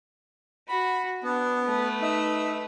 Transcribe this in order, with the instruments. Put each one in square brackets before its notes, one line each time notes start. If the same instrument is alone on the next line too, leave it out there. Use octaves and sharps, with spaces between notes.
[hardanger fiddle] F#4 [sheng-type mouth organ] B5
[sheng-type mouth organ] B3 [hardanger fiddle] D4
[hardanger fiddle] A3 B4
[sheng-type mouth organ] D#4 E5